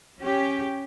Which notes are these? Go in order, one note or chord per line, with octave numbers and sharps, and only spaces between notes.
C#4 G4